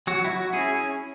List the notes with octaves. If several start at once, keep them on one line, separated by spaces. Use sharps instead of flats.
F#3 F#4
E4
F#4
C#4 E4 G#4